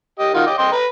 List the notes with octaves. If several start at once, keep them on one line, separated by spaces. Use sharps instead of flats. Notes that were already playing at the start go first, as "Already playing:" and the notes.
G4 D#5
D#3 F4 F#4
D#5 G5 D6
D#5 G5 C6
B4 A#5